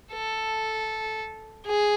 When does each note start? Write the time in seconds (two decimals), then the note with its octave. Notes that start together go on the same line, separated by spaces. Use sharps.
0.13 A4
1.66 G#4